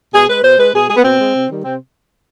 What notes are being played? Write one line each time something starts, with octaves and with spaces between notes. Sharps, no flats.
B2 G#4
G#3 B4
B2 C5
G#3 B4
B2 G#4
G#3 G#4
B3
B2 C4
G#3
C3
D#3 G3
C3 C4